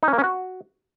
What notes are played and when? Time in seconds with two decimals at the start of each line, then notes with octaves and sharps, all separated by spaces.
0.03 D#4
0.08 C#4
0.13 A#3
0.18 C#4
0.24 F#4